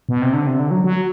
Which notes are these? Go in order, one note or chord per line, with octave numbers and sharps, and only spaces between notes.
B2
C3
D3
C3
D3
F#3
F#3